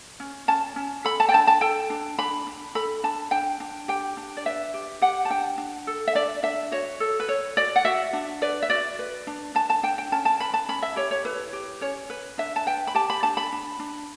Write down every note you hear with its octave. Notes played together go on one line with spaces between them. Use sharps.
C#4
C#4 A5
C#4
A4 B5
A5
G5
D4 A5
A5
A4 G5
D4
D4 B5
D4
A4 B5
D4 A5
D4 G5
D4
G4 G5
D4
D5
B4 E5
G4
G4 F#5
A5
D4 G5
D4
A4
E5
D4 D5
D4 E5
F#4 C#5
A4
B4
A4 C#5
F#4 D5
F#5
F#4 E5
D4
B4 D5
E5
F#4 D5
B4
D4
D4 A5
A5
D4 G5
G5
C#4 A5
A5
B4 B5
A5
C#4 B5
E5
G4 C#5
C#5
E4 B4
G4
C#4 C#5
B4
D4 E5
A5
B4 G5
B5
G4 A5
B5
D4 A5
B5
D4
D4